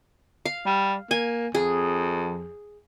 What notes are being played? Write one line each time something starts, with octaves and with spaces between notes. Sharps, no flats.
F5
G3
A#3 G#5
F2 G#4